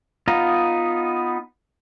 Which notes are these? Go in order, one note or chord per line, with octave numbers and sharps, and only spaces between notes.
B3 D#4 F4 D#5 A#5